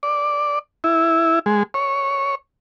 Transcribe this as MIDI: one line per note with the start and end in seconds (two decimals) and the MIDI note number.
0.03 0.59 74
0.84 1.39 64
1.46 1.63 56
1.74 2.35 73